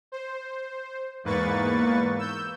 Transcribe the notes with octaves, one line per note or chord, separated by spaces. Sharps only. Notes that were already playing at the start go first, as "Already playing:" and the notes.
C5
E2 G#2 A#3 B4 C#6 A6
E6 G6